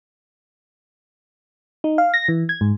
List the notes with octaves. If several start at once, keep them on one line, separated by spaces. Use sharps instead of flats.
D#4
F5
A#6
E3
G#6
G#2